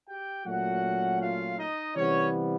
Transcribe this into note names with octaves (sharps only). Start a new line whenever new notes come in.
G4 G5
A#2 F#3 A3 C#4 F#4 F#5
F4 F5
D#4 D#5
C3 E3 G3 B3 C#4 C#5